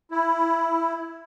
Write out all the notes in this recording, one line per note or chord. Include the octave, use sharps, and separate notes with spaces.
E4